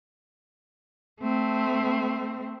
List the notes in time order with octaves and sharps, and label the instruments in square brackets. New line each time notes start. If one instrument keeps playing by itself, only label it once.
[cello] A3 C4